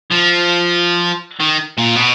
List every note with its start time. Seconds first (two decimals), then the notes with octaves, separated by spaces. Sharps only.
0.11 F3
1.40 D#3
1.78 A#2
1.96 B2